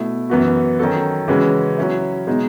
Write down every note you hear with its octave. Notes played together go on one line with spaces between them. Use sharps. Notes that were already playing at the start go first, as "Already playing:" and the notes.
Already playing: B2 A3 E4
F#2 E3 B3 F#4
D#3 F#3 C#4 F#4 A4
C#3 E3 G#3 C#4 F#4
F#3 C#4 E4
B2 G#3 D#4